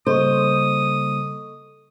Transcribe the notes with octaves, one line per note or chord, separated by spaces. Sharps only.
C#3 G3 A#3 A4 C5 D#5 C#6 D#6